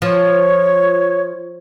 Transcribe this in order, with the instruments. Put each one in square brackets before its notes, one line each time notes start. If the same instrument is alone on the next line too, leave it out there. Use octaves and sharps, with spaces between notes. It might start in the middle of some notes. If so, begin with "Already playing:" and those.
[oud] F3 [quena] C#5